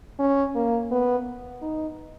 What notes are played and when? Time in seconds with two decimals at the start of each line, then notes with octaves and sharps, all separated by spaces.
0.19 C#4
0.55 A#3
0.91 B3
1.62 D#4